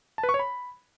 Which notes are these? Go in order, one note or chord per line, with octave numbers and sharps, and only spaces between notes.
A5
B4
C#6
C#5
B5